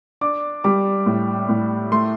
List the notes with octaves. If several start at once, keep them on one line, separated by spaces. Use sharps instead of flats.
D4 D6
G3 D6
A2
A2
A3 C6